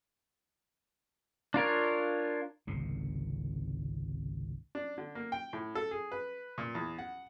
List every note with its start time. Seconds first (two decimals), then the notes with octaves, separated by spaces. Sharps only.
1.54 D4 F4 A#4 C#5
2.67 G#1 C#2 C3
4.75 D4
4.98 D3
5.15 A#3
5.32 G5
5.53 A2
5.75 A4
5.91 G#4
6.12 B4
6.58 A#2
6.75 E2
6.99 F#5